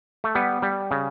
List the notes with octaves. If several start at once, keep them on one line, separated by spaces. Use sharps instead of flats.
A3
G3 B3
G3
C#3